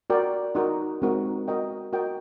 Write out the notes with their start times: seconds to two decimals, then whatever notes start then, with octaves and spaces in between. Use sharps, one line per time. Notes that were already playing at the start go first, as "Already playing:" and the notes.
0.10 F#4 A#4 D5 G5
0.55 D#4 F#4 A#4
1.02 G#3 C4 D#4 F#4 A#4
1.48 F#4 A#4 D#5 G5
1.93 F#4 A#4 D#5 G5